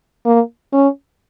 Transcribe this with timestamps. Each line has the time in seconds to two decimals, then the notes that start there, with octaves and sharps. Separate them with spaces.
0.26 A#3
0.73 C#4